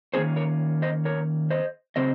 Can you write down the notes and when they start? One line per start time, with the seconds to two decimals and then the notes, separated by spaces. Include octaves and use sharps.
0.14 D#3 A#3 C#4 G#4 C5
0.36 A#4 C#5
0.82 C5 D#5
1.05 A#4 C#5
1.51 C5 D#5
1.96 C#3 F#3 C4 C5 D#5